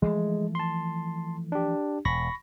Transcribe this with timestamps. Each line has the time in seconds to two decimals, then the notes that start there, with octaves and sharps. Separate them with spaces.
0.02 E3 F3 G#3 A3
0.55 A5 C6
1.52 D4 G4
2.05 E1 B5 C#6 A#6